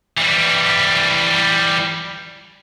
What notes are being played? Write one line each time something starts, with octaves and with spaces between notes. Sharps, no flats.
E3 G3